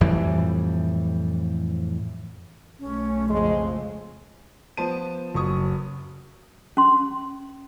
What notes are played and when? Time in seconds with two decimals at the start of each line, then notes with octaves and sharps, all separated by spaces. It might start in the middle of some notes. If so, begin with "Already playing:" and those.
0.01 F2 A2 E3 G3
2.80 B1 A3 C#4
3.30 F2 C#3 F3 G#3 C6
4.77 F3 B3 C5 A5 D#7
5.34 F#1 F#3 C#6 D#6
6.77 C#4 C6